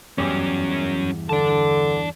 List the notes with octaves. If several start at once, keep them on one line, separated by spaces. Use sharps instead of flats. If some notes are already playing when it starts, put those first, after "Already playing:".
E2 G2 F#3 C#4
D3 D5 A5